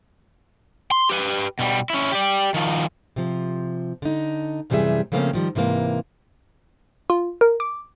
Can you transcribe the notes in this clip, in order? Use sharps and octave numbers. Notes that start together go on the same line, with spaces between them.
C6
G4 B4
B2 G3
C#4 E4
G4 D5
D#3 F3
C3 F3
D3 D#4
F#2 C3 E3 G3 G#4 E5
C#3 F3 A3 A#3 C4 C#4
D#3 F3 G3
G#2 C3 E3 A#3
F4
A#4
D6